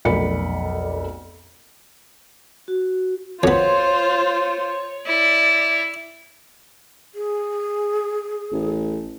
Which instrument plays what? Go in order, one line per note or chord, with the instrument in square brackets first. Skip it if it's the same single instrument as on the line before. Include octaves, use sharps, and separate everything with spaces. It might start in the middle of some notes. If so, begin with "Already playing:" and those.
[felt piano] F1 B1 A#4 D5 B5 C#7
[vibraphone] F#4
[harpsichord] F2 B3 [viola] F4 C5 [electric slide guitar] C#5
[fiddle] E4 [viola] D5
[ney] G#4
[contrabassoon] A1